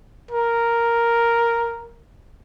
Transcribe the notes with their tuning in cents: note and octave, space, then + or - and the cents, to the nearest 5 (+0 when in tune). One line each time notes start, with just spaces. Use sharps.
A#4 +0